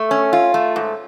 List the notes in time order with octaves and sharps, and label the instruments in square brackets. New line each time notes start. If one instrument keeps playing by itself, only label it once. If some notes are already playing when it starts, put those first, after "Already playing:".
Already playing: [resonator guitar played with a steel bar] A3
C#4
F4
A3
G#2